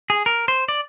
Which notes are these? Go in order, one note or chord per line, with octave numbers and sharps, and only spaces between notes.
G#4
A#4
C5
D5